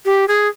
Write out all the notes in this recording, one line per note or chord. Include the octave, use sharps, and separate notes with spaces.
G4
G#4